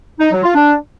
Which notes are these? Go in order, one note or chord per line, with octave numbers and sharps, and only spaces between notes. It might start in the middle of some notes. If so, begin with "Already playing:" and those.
D#4
F#3
F4
D4